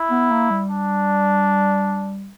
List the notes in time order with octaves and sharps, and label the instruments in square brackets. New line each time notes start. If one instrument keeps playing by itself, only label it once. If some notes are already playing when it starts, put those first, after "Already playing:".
Already playing: [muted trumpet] E4
[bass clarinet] B3
A#3
G3
[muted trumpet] D4